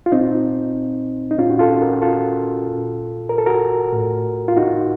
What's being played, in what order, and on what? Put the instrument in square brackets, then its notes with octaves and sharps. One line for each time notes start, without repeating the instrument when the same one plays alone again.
[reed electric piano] F4
A#2 C4 D#4
D#4
A#2 C#4 F4
F#4
F4 A4
F#4 A#4
F4 A4
A#2
A#4
A4
F#4 A#4
A2
F4
D#4 F#4